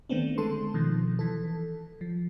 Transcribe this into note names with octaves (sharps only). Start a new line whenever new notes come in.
D#3 A3 B3 C4 D4
D3 G#3 A4 C6
B2 D#3 F3
E3 A4
F3